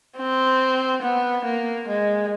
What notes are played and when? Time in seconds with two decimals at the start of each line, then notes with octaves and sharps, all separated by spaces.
0.18 C4
1.02 B3
1.45 A#3
1.88 G#3